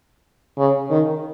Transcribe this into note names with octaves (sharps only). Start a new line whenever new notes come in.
C#3
D#3